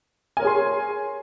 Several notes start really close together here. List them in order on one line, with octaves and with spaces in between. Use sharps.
G#5 A#4 C#5 G#4 C6